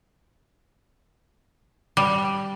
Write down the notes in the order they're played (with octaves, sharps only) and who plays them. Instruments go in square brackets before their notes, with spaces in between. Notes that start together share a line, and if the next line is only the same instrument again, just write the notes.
[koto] G3